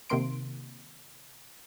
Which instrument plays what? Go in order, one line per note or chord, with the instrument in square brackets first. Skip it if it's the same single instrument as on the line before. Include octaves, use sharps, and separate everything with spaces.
[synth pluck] C3 D#3 A#3 C6 D7